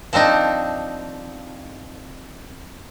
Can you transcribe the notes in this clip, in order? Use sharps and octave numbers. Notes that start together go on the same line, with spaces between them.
F3 C4 D4 D#4